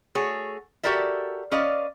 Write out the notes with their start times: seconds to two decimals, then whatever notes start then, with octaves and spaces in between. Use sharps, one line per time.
0.15 A3 F#4 G#4 C#5
0.83 F#4 G4 A4 A#4 D5 E5
1.51 C#4 B4 D5 D#5 F5